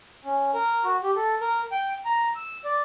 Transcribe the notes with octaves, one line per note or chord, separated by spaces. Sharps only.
C#4
A#4
F#4
G4
A4
A#4
G5
A#5
E6
D5